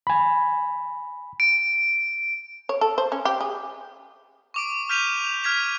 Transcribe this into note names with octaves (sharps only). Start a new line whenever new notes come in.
G#5 B5
D7
C#5
A4
C5
C#4
G4
G#4
C#6 D6 D7
F6 G6 B6 D#7 F7
F6 G#6 B6 F7